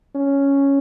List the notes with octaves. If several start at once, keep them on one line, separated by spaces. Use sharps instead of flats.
C#4